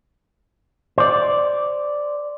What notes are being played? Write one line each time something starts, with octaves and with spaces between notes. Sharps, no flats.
C5 D5